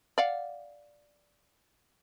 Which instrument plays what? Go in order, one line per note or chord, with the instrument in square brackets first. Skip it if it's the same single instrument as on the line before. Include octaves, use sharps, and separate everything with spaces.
[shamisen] D5 F5 F#5